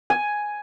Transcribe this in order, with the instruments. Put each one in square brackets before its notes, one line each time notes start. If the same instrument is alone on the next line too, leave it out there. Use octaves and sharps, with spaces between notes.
[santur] G#5